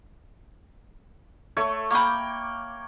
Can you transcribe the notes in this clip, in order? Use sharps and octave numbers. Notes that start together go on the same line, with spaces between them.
A3 A4 C#5
A#3 G5 B5 C#6